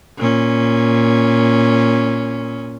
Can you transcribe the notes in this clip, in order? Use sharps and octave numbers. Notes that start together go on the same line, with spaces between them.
A#2 C#4